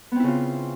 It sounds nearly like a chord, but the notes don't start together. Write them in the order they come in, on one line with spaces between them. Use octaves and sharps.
B3 C4 E4 C#3 F4